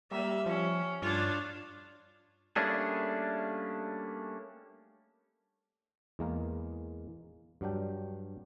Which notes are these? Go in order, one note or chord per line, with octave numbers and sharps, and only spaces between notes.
G3 A#3 E5
F3 C#4
G2 D4 F4 C#5
G3 A3 A#3 C#4 D4 G#4
E2 G#3 A#3 A#4
G2 F#3 D4 G5